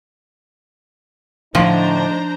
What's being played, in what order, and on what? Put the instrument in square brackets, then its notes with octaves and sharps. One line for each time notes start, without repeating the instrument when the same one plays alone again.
[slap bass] A2 D3 [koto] F3 [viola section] D4 C5 A#5 [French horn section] D#4